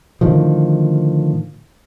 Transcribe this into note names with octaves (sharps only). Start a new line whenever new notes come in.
A2 D3 D#3 F3